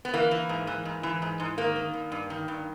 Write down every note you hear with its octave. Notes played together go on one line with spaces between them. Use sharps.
B3
E3 A#3
E3
G#2
E3
G#2
E3
G#2
G#2
D#3 A#3
D#3
G2
G2
D#3
G2